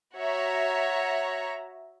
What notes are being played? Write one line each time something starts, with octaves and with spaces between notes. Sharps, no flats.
F#4 C#5 E5 A#5